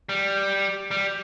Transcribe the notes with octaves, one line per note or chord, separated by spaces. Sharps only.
G3
G3